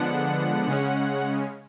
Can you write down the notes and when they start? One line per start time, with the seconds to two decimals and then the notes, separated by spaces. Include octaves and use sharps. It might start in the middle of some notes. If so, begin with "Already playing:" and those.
Already playing: D3 F3 G#3 B3 D4 F#5
0.68 C#3 G#3 C#4